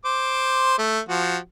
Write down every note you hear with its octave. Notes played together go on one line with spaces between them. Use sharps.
C5 D6
A3
F3 F#4